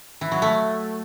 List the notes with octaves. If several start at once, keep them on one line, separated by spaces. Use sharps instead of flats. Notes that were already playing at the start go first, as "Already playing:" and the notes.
E3
F#3
A3